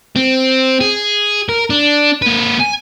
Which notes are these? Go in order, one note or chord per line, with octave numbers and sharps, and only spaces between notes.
C4
G#4
A#4
D4
A#3 B4
G#5